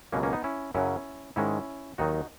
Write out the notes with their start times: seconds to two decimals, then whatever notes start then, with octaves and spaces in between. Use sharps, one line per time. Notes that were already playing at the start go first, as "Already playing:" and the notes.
0.12 C#2 B2 F#3 A#3 C#4
0.23 A#3 C#4
0.33 B3 D#4
0.44 C#4 E4
0.74 F#2 C#3 F#3 C#4 E4
1.36 G#2 D#3 G#3 C#4 E4
1.98 D#2 D#3 F#3 D#4 F#4